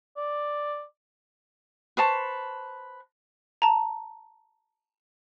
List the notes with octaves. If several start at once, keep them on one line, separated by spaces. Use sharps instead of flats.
D5
B4 C5 A5 C#6
A5 A#5